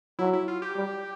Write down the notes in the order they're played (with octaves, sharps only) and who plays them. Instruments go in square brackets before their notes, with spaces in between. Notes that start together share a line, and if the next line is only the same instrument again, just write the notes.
[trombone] F#3 [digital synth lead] E4
[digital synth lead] E4
F4
G4
[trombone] G3